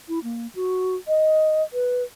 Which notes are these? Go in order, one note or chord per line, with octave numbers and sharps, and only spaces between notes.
E4
A#3
F#4
D#5
B4